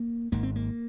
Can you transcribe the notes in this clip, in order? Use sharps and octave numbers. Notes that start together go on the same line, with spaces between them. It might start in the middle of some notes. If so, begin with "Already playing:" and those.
Already playing: A#3
G#1 G#2 A#3
C4
A#3